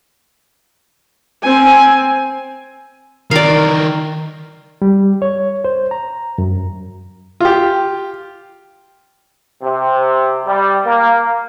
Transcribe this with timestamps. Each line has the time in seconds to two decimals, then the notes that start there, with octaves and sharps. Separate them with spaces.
1.43 C4 G#5
3.31 D#3 E3 A#4 D5 F5
4.82 G3
5.22 C#5
5.65 C5
5.91 A#5
6.38 F#2
7.40 F4 G4
9.62 C3
10.45 G3
10.85 A#3